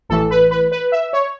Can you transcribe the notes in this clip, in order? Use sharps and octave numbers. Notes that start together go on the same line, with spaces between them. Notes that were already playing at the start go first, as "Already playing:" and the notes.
A1 A2 E3 A4
B4
B4
B4
E5
C#5